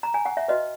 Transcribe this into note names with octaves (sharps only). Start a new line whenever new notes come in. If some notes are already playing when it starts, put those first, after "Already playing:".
A#5
G#5
F#5
E5
F#4 B4 D#5